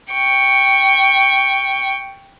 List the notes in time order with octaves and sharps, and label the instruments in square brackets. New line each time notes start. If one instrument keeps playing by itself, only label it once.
[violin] G5 C#6